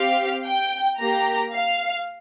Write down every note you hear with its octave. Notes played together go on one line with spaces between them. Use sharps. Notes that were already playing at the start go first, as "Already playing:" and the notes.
Already playing: C4 G4 F5
G5
A#3 G4 A#5
F5